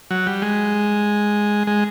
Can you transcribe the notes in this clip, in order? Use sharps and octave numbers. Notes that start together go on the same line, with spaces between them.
F#3
G3
G#3
G#3